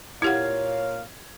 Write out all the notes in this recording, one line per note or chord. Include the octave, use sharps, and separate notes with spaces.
A#2 E4 G4 C#5 F5 F#5 G#6